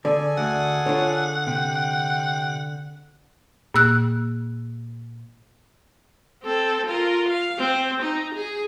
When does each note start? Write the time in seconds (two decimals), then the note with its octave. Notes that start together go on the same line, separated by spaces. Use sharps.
0.05 D3 G#4 A4 D5 G#5
0.37 D2 F#5
0.86 D3 D4 F4 C#5
1.47 C3 G5
3.74 A#2 A#3 E6 F#6
6.44 C4 A4
6.86 F4 A#4
7.28 F5
7.58 C4
8.02 D#4
8.34 G#4